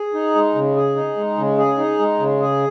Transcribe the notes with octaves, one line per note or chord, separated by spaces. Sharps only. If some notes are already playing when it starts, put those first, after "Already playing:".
Already playing: G#4
D#4
G#3
C#3
G#4
D#4
G#3
C#3
G#4
D#4
G#3
C#3
G#4